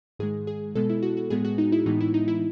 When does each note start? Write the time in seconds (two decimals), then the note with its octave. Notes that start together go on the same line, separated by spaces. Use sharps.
0.19 G#2 D#3 G#3 G#4
0.47 G#4
0.75 B2 G#3 B3 A4
0.89 E4
1.03 F#4
1.17 F#4
1.30 A2 G#3 B3 G#4
1.45 F#4
1.58 D#4
1.72 E4
1.86 A2 E3 G#3 B3 D#4
2.01 E4
2.14 D#4
2.28 E4